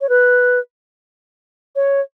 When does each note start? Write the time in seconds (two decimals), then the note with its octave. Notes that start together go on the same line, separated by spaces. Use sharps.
0.01 C#5
0.09 B4
1.76 C#5